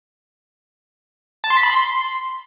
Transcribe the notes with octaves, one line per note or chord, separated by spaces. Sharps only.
A5
C6
B6
B5
C6